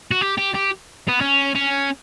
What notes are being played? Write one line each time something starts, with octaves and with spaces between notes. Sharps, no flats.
F#4
G4
G4
G4
B3
C#4
C#4